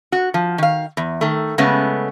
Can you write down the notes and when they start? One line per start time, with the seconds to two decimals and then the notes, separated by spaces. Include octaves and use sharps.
0.12 F#4
0.34 F3
0.58 D#3 F5
0.97 E2
1.21 D#3 A3
1.58 C#3 G#3 A3 B3 C#4